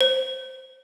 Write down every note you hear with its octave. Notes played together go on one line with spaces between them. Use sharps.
C5